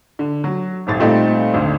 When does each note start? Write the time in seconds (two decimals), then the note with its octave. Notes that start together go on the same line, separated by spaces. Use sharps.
0.19 D3
0.44 F#3
0.87 D#1 G#1 A6
1.00 A#2 G3 A3 C4 D#4
1.53 G#1 D2 D3